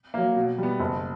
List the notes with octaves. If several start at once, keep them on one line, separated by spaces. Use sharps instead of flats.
F#3 A#3
B2
G3 B3
F#1